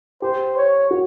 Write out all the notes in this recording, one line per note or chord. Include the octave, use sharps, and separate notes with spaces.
G4 C5
C#5
F#4